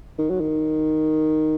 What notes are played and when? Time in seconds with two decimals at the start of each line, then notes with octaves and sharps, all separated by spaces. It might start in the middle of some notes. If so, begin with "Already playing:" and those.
0.18 D#3
0.30 F#3
0.40 D#3